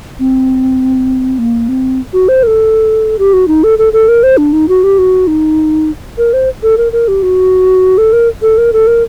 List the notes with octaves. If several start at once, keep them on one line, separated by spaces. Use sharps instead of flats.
C4
A#3
C4
F#4
C5
A#4
A4
G4
F#4
D#4
A4
A4
A4
A#4
C5
D4
D#4
F#4
G4
F#4
D#4
A#4
C5
A4
A#4
A#4
G4
F#4
A4
A#4
A4
A#4
A4
A#4